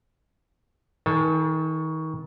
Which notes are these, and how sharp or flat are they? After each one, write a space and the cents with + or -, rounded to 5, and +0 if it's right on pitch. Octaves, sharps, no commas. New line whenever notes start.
D#3 +35 A4 +0 G#5 +10